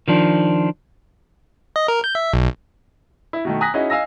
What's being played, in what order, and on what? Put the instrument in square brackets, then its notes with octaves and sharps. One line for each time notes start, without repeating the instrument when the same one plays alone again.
[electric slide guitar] D#3 F3 D4
[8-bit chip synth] D#5
A#4
G6
E5
B1
[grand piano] E4
B2 D#3 A3
G#5 A#5 D#6 F#6 A#6 B6
C#4 D#4 E4 F#4 G#4 D#5
D#5 F5 G#5 E6 A#6